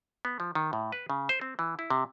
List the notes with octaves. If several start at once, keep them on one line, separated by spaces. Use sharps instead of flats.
B3
F3
D#3
A2
B4
C#3
C5
C4
E3
E4
C3